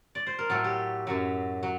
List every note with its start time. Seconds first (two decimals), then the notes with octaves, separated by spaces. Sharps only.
0.15 D5
0.26 C5
0.38 A#4
0.50 A2 F#3 A4
0.64 G4
1.07 F#2 F#3
1.63 F#3